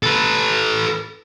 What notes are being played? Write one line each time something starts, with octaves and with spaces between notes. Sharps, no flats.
A4 B4